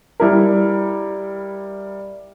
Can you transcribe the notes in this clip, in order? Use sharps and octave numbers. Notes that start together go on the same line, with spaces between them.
G3 E4 A#4